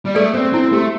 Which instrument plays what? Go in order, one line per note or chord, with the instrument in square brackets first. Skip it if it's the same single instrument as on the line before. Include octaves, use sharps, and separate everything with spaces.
[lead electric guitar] G3
[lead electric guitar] A3 [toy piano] A4 D5
[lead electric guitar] C4 [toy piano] C5
[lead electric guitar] C4 [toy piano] E4
[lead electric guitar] A3 [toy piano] G4